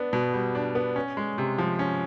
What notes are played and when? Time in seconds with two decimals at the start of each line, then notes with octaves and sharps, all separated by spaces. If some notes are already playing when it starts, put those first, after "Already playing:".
Already playing: B3 D4
0.13 B2
0.34 G3
0.55 D4
0.75 B3
0.96 C#4
1.17 G#3
1.38 C3
1.59 F3
1.79 C#4